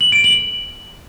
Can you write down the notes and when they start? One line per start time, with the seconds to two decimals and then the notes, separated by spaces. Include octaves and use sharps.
0.01 F#7
0.12 D7
0.24 F#7